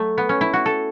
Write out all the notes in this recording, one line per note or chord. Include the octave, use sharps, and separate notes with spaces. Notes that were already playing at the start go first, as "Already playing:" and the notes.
Already playing: F#3 A3
B3
C#4
E4
F#4
A4